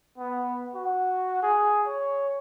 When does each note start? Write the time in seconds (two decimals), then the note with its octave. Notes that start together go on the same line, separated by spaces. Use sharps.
0.18 B3
0.75 F#4
1.43 G#4
1.87 C#5